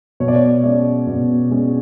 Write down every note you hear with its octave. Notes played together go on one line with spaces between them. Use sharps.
B2 C#5
D5
C#5
G#3 C#4 D5
B2
G#3 C#4